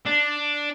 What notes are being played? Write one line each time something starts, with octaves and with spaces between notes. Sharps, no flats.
D4